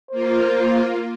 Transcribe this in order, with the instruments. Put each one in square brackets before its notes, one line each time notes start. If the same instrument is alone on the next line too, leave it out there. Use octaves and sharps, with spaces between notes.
[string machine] A#3 F4 [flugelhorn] C5